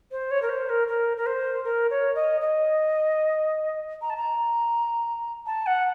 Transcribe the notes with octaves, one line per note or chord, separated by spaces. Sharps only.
C5
C#5
A#4
C5
A#4
A#4
A#4
C5
A#4
C#5
D#5
D#5
A#5
A5
A#5
A5
F#5